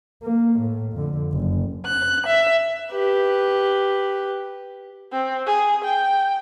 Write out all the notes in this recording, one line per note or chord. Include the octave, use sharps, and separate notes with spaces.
A#3
A2
F2 D3
F#1
F#6
E5
G4 B4
C4
G#4
G5